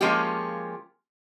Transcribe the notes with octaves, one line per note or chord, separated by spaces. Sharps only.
F3 G#3 A#3 C#4 F4 G4